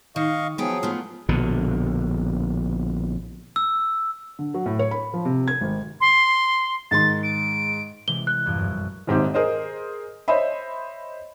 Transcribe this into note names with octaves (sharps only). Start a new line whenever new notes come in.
D#3 D#5 F5 C#6
F3 F#3 B3 G#4 G5
A3 B3 F4
A#1 B2 D3
E6
D3
F#3
A2
C#5
B5
F3
C3
G#6
G#1
C6
G#2 D#3 C6 A6
D7
C3 E3 G#3 G7
F#6
A#1 E2 G2
F#2
D#1 G#2 C4 G4
G#4 A#4 C5 D#5
C5 C#5 D#5 E5 B5